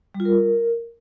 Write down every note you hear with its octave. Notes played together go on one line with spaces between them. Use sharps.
G3
F4
A#4